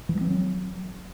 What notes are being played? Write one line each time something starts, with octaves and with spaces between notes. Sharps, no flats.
E3
G3
C4
F#3